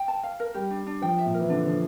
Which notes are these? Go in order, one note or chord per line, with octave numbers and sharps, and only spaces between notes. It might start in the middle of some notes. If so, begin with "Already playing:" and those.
Already playing: G5
A5
F5
A#4
G3 G4
D4
D4
F3 G5
E5
A#2
A#4
E3
D3 D4
F3 D4